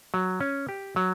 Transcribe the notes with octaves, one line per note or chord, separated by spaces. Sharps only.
F#3
C#4
G4
F#3